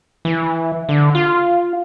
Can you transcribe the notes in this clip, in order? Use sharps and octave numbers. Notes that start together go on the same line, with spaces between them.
E3
D3
F4